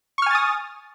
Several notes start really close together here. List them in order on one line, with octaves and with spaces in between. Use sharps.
C#6 F6 G#5 A6 D#6